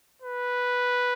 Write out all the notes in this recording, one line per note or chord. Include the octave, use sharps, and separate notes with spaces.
B4